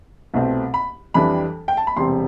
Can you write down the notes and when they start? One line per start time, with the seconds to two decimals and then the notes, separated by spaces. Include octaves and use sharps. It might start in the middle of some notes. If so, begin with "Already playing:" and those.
0.34 C2 B2 A3 C4
0.74 B5
1.14 F2 E3 G3 D4 B5
1.68 G5
1.77 A5
1.87 B5
1.96 E1 E2 C3 G3 C4 C6